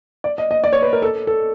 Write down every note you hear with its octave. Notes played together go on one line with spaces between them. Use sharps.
D5
D#5
D#5
D5
C#5
B4
A#4
A4
A4